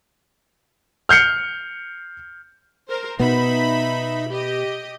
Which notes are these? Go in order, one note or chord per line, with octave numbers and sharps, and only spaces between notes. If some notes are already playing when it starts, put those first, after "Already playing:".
F6 G6 C7 C#7
A#4 C5
B2 B3 D#4 E5 B5
G4 D#5